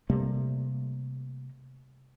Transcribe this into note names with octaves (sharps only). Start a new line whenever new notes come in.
C3 G3 A3 A#3